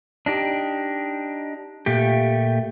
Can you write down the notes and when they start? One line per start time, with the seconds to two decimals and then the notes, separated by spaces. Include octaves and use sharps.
0.26 D4 D#4 G4
1.86 A#2 A3 G4